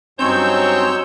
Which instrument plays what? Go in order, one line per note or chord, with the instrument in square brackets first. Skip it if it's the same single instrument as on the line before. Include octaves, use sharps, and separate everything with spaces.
[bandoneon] G2 C#4 D#4 [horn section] F#3 C#5 [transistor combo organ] C4 [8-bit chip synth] E6 G6